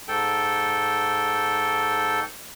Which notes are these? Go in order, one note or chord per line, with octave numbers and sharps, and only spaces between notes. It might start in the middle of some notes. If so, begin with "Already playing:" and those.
G#2 A4 G5